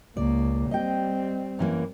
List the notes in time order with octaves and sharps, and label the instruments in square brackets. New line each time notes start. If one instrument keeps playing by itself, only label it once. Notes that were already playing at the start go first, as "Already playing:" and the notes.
[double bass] C#2 A#3 [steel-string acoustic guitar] D5
[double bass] G3 C4 [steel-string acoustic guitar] D#5 G5
[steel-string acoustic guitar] F#2 E3 A#3